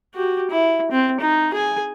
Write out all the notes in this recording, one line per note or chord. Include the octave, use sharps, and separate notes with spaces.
F#4 G4
E4
C4
D#4
G#4 G#5